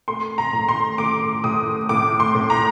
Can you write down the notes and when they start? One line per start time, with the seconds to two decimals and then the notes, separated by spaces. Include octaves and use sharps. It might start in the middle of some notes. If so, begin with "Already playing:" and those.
0.08 A3 C6
0.38 A#5
0.53 A2
0.68 C6
0.98 A3 D6
1.44 A2 D#6
1.89 A2 D6
2.20 C6
2.35 A2
2.50 A#5